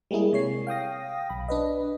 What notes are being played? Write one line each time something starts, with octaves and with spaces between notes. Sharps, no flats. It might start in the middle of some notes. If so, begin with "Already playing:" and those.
G3 G#3 A#3 E4 G#4
C3 C#5 C7
F5 G5 D#6 A#6
B1 B5
D4 B4 D#5